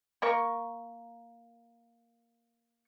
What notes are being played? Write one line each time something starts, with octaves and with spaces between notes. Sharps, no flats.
A#3 A#4 C#6